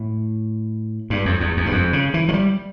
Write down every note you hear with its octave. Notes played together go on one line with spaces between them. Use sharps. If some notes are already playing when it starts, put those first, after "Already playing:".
Already playing: A2
G2
F2
E2
E2
G2
F2
C#3
E3
F3
G3